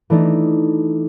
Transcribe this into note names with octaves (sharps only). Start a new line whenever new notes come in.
E3 A3 D4 D#4